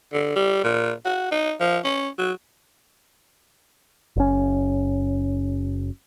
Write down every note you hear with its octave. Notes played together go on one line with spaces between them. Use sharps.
D3
G3
A#2
F#4
D#4
F3
C#4
F#3
F#1 C#4